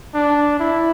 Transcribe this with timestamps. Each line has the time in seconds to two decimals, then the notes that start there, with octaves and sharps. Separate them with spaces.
0.14 D4
0.59 E4